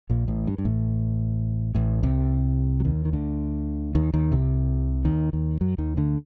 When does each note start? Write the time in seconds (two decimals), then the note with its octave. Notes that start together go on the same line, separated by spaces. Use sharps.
0.10 A#1 A#2
0.28 A1 A2
0.47 G2
0.58 G2
0.65 A1 A2
1.75 A1 A2
2.03 C2 C3
2.80 F#3
2.85 D#2 D#3
3.05 D#3
3.13 D2 D3
3.95 D#2 D#3
4.14 D#2 D#3
4.32 C2 C3
5.05 D#2 D#3
5.33 D#2 D#3
5.61 F#2 F#3
5.78 D#2 D#3
5.97 D2 D3